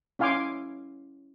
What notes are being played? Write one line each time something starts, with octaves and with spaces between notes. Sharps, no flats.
C#4 E4 F5 G#5 C6 D6